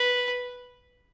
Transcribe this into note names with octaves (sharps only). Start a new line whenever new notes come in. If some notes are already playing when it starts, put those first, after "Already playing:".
Already playing: B4